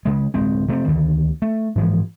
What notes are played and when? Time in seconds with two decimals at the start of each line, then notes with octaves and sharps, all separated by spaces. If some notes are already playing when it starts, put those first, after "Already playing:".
0.05 C#3 G#3
0.34 D1 G#3 C4
0.68 C3 A3 B3 C4
0.88 D2 D3 D#3
1.42 A3
1.76 G#2 E3 F3 G#3